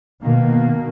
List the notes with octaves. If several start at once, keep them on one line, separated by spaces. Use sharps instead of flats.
B2 D#3 A#3